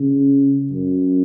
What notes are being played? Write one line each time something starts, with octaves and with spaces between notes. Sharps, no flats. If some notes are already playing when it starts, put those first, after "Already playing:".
Already playing: C#3
F#2